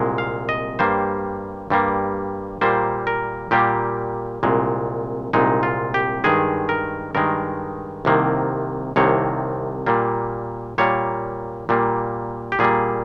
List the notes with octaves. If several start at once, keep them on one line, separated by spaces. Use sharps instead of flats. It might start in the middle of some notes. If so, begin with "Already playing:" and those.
Already playing: C2 A#2 G#3
F5
D#5
G2 G3 A#3 C5
G2 G3 A#3
A#2 G3 A#3 C5
A#4
A#2 G3 A#3 G4
C2 A#2 G#3
C2 A#2 G#3 D#4
F4
G4
G2 D#3 G#3 G#4
A#4
G2 D#3 G#3 A#4
C2 C3 D#3 A#3
C2 C3 D#3 A#3 C#5
A#2 G3 A#3
A#2 G3 A#3 C#5
A#2 G3 A#3
G4
A#2 G3 A#3 G#4